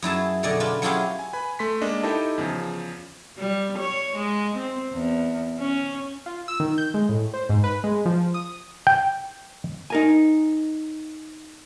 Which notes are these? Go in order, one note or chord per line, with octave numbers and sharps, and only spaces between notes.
F#2 E4 G#4 A5
B2 D3 D5 D#5 G#5
D4 F4 B4
F#3 C#4 E4 F4 G4 G#4
G#5
B4 G#5 B5
A3 C6 B6
G#3 A#3 D4 D#5
D#4 E4 G4 A4 D#5 A5
E2 C#3 F3
G3
C#5
G#3
C4
E2
C#4
F4
E6
D#3
G6
G#3
A2
C5
G#2
B4
G#3
F3
D#6
G5
D#4 A#4 G#5